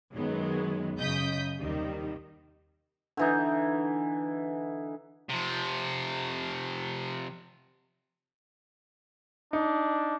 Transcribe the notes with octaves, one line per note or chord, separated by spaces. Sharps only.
F#2 D#3 F#3 G#3 B3
F#2 C#3 D#5 D#6 G6 B6
D#2 C3 D#3 G3
D3 E3 D#4
C3 F3
D4 D#4